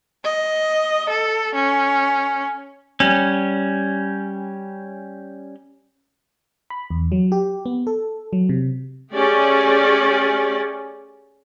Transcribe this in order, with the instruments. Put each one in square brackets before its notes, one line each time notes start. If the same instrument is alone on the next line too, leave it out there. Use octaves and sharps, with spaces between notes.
[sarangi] D#5
A4
C#4
[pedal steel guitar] G3 C#4
[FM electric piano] B5
E2
F#3
G4
B3
A4
F#3
C3
[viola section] A3 C#4 G4 G#4 D5